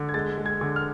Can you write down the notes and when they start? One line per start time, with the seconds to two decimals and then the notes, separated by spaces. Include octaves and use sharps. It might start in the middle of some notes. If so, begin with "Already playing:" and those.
Already playing: D3
0.09 G#6
0.14 G#3 A6
0.38 G#3
0.46 G#6
0.61 D3
0.76 F6